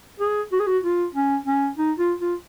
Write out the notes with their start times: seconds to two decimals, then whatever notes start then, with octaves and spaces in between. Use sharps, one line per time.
0.20 G#4
0.52 F#4
0.60 G#4
0.67 F#4
0.84 F4
1.15 C#4
1.47 C#4
1.78 D#4
1.99 F4
2.20 F4